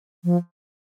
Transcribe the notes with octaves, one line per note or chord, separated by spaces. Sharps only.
F3